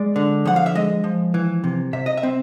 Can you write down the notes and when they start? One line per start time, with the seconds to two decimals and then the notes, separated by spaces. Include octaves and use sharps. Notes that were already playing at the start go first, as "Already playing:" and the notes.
Already playing: G#3 D5
0.16 D3
0.45 F3 F#5
0.56 F5
0.66 E5
0.75 G#3 D#5
1.04 F3
1.34 E3
1.64 C3
1.93 C3 E5
2.06 D#5
2.17 E5
2.23 C4